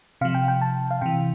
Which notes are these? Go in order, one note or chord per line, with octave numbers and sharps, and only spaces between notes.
C3 F3 F5
G5
G5
A5
F5
C3 E3 G5